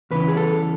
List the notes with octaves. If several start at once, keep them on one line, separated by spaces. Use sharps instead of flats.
E2 C#3 E3 B4
G#4
A4